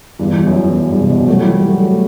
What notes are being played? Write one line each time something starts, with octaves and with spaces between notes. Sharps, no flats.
E2 G2
E2
F#2
E2
F#2
E2 G2
C3
G2 B2
F#3 A3
E3 G3
F#3 A3
F#3 A3
F#3 A3